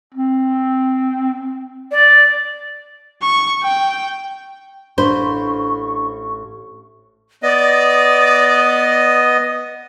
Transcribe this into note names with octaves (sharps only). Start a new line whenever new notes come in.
C4
D5
C#6
G5
A1 D4 C5 B5 C#6
B3 D5 D#5